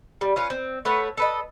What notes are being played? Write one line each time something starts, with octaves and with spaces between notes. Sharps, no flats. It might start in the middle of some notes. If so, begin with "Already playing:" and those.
G3
C#4 F4 B4
C4
A3 B4 C#5 F#5
A4 B4 D#5